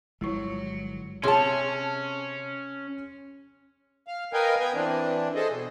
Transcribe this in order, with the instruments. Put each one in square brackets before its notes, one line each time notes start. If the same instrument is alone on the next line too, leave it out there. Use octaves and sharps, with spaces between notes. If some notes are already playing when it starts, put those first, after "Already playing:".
[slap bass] G1 F3 [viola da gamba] F#3 [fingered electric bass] G#3 [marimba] E4 C#6
[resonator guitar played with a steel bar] C3 A5 [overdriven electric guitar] C#4 [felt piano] G#4 C#5 C6
[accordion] F5
A#4 B4 D#5 F5 G5 G#5
B3 G5 G#5
E3 C4 D4
G#4 A4 C5 D#5
B2